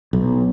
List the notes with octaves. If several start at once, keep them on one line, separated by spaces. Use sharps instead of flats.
B1